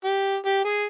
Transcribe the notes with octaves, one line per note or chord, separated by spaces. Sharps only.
G4
G4
G#4